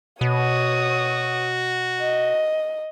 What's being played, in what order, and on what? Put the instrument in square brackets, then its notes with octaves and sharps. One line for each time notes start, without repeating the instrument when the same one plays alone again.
[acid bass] B2 [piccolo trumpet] F#4 [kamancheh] C#5 D#6
[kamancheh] D#5